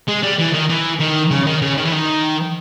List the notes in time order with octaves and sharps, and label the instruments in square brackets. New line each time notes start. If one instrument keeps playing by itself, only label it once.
[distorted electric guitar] G#3
G3
E3
D#3
E3
D#3
C#3
D#3
C#3
D#3
E3
D#3